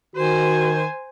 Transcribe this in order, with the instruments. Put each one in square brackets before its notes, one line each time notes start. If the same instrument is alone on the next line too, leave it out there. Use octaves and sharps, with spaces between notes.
[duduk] D#3 [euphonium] F#4 [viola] C5 G#5